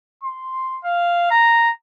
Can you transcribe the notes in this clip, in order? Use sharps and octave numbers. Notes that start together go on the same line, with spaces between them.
C6
F5
A#5